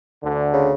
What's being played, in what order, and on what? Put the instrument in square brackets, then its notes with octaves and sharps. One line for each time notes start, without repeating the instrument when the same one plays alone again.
[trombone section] D2 D3
[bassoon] C#3